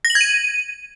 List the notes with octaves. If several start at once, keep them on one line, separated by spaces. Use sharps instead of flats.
A#6
F#7
G#6
D#7